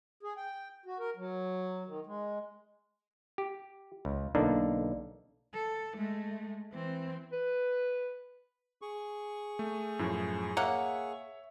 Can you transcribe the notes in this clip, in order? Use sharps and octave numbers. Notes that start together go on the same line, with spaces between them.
G#4
G5
F#4
A#4
F#3
D#3
G#3
G4
C#2
B1 D3 A#3 D4 D#4
A4
G#3 A3
E3 C4
B4
G#4 C#6
A3
F#2 A2 F3
A#3 C#5 E5 F#5